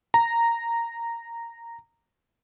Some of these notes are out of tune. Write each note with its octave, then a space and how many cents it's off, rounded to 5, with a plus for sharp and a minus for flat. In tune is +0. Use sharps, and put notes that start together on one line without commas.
A#5 -10